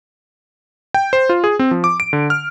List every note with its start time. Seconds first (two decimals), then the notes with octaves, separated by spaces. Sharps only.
0.94 G5
1.13 C5
1.29 F4
1.44 G#4
1.59 C4
1.71 F3
1.84 D6
2.00 D7
2.13 D3
2.30 F6